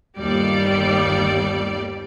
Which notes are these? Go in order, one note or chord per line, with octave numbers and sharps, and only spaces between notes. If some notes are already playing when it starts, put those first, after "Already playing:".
G1 D#2 G3 D5